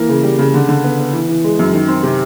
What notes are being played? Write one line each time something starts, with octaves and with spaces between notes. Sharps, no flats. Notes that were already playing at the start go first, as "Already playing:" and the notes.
Already playing: E3 A#3
C#3
G3
C#3
D3
D3
B3
B3
E3
E3
G#3
F#2
D#3
C4
C3